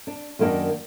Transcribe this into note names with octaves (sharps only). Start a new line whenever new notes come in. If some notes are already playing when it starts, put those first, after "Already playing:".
D4
F#2 D#3 A#3 D4